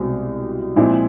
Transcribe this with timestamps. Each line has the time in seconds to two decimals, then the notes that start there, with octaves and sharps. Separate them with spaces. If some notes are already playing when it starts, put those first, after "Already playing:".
Already playing: C2 B2 G#3 C4
0.76 A#2 F3 G#3 C4 E4